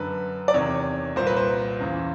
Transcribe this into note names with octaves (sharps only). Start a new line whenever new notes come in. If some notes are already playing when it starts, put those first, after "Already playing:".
Already playing: F#2 D3 B4
D5
E2 C3 D#3 C#5
C2 A#2 C5
B4
C5
E2 C#3 E3